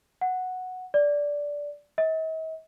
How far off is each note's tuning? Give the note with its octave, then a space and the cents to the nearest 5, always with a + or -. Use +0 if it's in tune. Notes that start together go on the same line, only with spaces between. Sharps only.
F#5 -5
D5 -10
D#5 +45